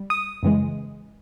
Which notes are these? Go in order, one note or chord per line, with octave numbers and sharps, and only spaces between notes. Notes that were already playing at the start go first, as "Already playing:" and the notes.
Already playing: G3
D#6
F#2 C#3 E3 G#3